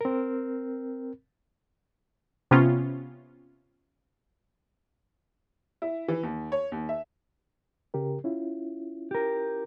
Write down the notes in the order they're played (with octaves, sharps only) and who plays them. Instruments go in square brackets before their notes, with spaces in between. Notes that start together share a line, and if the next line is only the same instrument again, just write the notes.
[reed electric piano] C4 A#4
[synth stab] C3 B3 C#4 F4
[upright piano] E4
E3
D#2
C#5
D#2
E5
[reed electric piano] C#3 G4 A#4
C#4 E4 F4
[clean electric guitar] G4 A#4